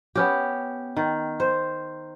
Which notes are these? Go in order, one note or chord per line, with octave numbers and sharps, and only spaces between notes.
B3 C#4 G4
D#3
C5